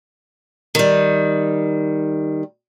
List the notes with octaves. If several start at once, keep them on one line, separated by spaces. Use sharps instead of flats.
D#3 G3